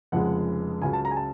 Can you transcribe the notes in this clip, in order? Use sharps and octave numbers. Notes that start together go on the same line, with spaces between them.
F1 F2 C#3 F3 G#3 F#5
C#2 C#3 F#3 G#5
A5
A#5
G#5
A5